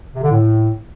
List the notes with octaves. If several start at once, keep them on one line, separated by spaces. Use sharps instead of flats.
C3
D3
A2